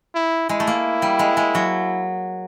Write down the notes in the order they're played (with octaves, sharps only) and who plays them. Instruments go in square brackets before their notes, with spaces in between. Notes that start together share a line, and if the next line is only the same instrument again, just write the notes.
[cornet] E4
[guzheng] G#3 [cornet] E4
[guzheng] A3
A#3
G3
G#3
G#3
F#3